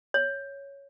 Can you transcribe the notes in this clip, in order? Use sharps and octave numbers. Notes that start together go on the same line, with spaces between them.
C#5